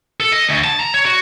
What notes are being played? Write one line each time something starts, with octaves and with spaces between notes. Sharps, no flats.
A4
D#5
D2
A5
A#5
C#5
F#4